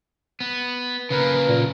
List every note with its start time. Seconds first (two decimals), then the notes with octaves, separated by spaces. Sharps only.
0.40 B3
1.10 C#3 A#3 B4
1.46 A#2